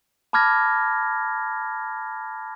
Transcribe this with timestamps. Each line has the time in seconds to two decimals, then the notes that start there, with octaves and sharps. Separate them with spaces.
0.33 A5 B5 D6 F6 G#6 A#6